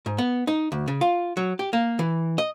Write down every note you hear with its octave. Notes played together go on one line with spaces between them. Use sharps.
G#2
B3
D#4
D2
C#3
F4
F#3
G4
A#3
E3
D#5